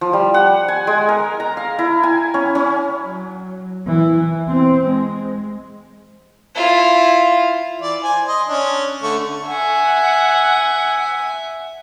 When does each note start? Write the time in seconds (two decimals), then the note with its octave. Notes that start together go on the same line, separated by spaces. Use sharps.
0.01 F3
0.13 G3
0.34 F#5
0.68 G#5
0.87 G#3
1.09 A#4
1.40 A#5
1.57 F5
1.79 E4
2.03 G#5
2.34 C#4
2.55 C#4
3.02 F#3
3.87 E3
4.48 C4
4.87 G#3
6.55 E4 F4
7.82 E3 D5
8.04 C5 G#5
8.28 D#5 C6
8.49 C#4 D4
9.02 D3 A3 C#6
9.47 E5 F#5 G#5